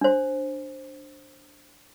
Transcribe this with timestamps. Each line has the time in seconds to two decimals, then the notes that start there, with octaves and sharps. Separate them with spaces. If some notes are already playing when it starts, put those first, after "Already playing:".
0.01 D4 C5